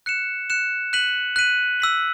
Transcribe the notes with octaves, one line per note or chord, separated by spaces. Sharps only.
F#6 C#7 E7
F#6 C#7 E7
F#6 B6 D#7 F#7
F#6 B6 D#7 F#7
E6 B6 F#7